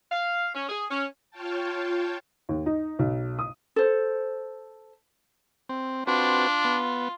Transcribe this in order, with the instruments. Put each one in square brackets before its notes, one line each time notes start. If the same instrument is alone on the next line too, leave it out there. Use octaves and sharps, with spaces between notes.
[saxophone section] F5
C#4
G#4
C#4
[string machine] F4 C#5 F5 G5 A5
[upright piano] D#2
D#4
B1
D#6
[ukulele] A4 C5
[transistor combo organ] C4
[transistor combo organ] C4 F#4 B4 [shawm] D4 [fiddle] F4
[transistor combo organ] B3